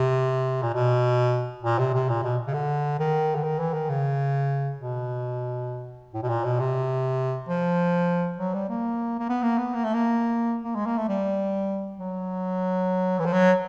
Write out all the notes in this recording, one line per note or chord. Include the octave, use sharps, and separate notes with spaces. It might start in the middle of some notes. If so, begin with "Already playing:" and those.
Already playing: C3
A#2
B2
A#2
C3
C3
A#2
C3
B2
C#3
D3
D#3
D3
D#3
E3
D#3
C#3
B2
A2
B2
A#2
B2
C3
F3
F#3
G3
A#3
A#3
B3
A#3
B3
A#3
A3
A#3
A#3
G#3
A#3
A3
G3
F#3
E3
F3
F#3